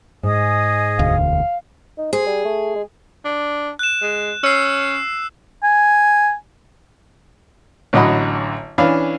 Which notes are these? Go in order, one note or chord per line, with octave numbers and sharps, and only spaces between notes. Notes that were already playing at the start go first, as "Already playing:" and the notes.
G#2 G#4 D#5 D#6
E1 D2 F5
D#4
G#4 C5
G3
A3
G#3
D4
F#6 E7
G#3
C#4 E6 C7
G#5
A1 D3 F#3 D#5 F#5 B5
E3 C#4 D4 F5 B5